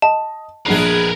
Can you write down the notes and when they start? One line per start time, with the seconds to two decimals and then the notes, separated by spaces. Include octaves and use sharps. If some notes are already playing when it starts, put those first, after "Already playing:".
0.02 D#5 A5
0.66 A#1 G#3 B3 D4 G#4 A#4 B4 C7